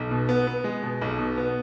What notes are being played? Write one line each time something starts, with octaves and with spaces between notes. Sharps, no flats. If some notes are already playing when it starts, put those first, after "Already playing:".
Already playing: B1
B2
B3
B3
G#3
B2
B1
B2
B3